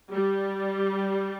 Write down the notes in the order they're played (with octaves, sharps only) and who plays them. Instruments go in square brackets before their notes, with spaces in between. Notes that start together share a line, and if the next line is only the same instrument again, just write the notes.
[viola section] G3